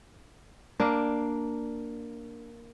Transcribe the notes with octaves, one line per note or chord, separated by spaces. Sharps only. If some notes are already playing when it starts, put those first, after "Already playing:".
A#3 D4